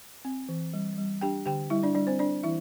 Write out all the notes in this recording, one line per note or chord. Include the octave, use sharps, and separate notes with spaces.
C4
E3
G3
G3
D4 G4 G5
D3 G4 G5
G3 E4 E5
D4 D5
G3 D4 D5
C4 C5
D4 D5
E3 E4 E5